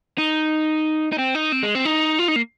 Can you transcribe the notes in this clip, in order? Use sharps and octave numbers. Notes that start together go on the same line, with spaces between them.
D#4
D#4
C4
D#4
C4
G#3
C4
D#4
F4
D#4
A#3